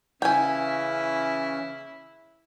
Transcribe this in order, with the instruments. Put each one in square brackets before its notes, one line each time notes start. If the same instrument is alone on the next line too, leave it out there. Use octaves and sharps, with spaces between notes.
[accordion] C#3 E3 C#4 [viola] E4 [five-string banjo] G5 G#5